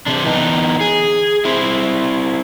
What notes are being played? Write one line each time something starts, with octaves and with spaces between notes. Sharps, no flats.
C3 D4
E3 B3 D#4
G#4
C4 E4